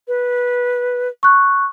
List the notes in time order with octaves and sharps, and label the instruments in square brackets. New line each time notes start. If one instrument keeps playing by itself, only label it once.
[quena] B4
[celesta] C#6 F#6